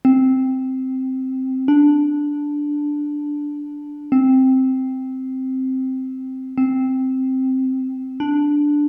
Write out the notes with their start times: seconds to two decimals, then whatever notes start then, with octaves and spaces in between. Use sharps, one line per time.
0.05 C4
1.68 D4
4.12 C4
6.58 C4
8.20 D4